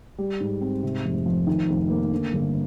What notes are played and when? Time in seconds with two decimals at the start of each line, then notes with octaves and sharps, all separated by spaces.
0.18 G3
0.40 G#2
0.61 C4
0.83 C3
1.05 F1
1.26 F3
1.47 D#3
1.69 F1
1.90 A#3
2.11 D3
2.33 G1